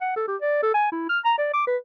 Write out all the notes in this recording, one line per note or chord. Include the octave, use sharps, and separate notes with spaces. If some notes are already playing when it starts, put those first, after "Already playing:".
F#5
A4
G4
D5
A4
G#5
E4
F6
A#5
D5
D6
B4